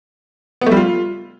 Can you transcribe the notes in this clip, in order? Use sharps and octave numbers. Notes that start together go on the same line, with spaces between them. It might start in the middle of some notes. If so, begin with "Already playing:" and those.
B3
A3
G3
F4